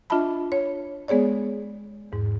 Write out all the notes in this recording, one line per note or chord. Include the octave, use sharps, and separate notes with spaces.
D4 F4 D#5 E5 A5 B5
C#5
G#3 B3 G#4 C#5 D5
E2 G#2